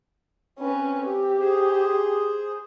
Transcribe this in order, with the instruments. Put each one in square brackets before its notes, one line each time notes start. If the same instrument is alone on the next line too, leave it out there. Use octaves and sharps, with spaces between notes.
[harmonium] C4 [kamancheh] C#4 B4
[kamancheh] G4
[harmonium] G#4 C5